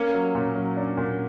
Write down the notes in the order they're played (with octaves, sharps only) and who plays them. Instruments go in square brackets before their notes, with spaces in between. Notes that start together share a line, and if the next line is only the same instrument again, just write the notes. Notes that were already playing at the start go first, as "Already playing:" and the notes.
Already playing: [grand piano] A#3 [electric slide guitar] C#4
[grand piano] F#3
A#2
F#3
D4
A#2